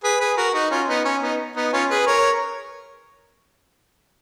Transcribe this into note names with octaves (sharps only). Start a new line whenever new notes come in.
G#4 B4
G#4 B4
F#4 A#4
D#4 F#4
C#4 F4
B3 D#4
C#4
B3 D#4
B3 D#4
C#4 F4
G#4 B4
A#4 C#5